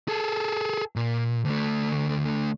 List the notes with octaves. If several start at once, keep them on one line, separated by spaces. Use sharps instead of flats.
G#4 A4
A#2
D2 A3